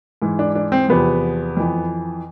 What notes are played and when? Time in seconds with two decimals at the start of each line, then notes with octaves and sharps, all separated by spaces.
0.22 G#2 E3
0.39 D4
0.55 D4
0.72 C4
0.89 E2 C3 F3 B3
1.57 F2 E3